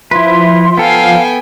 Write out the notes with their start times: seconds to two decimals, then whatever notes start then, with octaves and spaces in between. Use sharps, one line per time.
0.11 F3 E4 B4 E5 C6
0.78 B3 A4 F5 G5 G#5